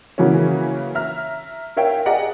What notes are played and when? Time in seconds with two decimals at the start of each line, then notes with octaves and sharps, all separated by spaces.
0.18 C#3 E3 F#3 A#3 C#4
0.95 E5 A#5 F6
1.77 A#4 C#5 E5 F5 G5
2.06 G#4 D5 D#5 F#5 A#5